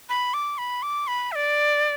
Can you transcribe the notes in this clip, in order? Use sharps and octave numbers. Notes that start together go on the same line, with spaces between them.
B5
D6
B5
D6
B5
E5
D5